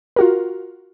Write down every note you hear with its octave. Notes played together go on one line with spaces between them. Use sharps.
F4 F#4 A#4